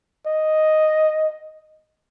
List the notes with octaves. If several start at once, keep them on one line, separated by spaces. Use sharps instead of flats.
D#5